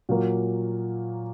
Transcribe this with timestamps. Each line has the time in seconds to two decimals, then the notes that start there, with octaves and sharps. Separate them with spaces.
0.09 A#2 F#3 A#3